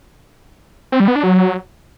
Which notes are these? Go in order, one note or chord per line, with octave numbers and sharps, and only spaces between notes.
C4
G3
B3
D4
F#3